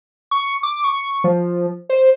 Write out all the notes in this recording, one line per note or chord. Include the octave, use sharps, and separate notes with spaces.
C#6
D6
C#6
F3
C5